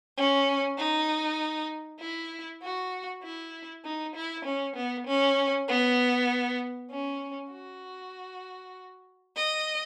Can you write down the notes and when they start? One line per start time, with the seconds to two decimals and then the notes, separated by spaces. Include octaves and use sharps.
0.17 C#4
0.78 D#4
2.00 E4
2.62 F#4
3.23 E4
3.85 D#4
4.16 E4
4.45 C#4
4.76 B3
5.07 C#4
5.68 B3
6.91 C#4
7.52 F#4
9.36 D#5